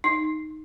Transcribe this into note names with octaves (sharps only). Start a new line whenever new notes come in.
D#4